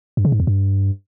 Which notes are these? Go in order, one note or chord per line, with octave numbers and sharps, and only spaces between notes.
G2
C#3
G#2
E2
G2